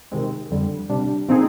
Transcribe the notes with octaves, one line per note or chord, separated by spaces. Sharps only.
C3 D#3 G#3 C4
F2 D3 G3
C3 G3 D4
A#2 F3 C4 D#4 G#4